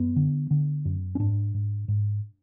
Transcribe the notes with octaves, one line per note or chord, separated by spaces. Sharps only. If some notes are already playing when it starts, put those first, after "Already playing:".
Already playing: F#2 B3
D3
D3
F#2
C#4
G#2 D4
G#2
G#2